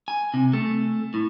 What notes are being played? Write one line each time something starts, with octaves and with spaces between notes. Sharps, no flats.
G#5
C3
A3
A2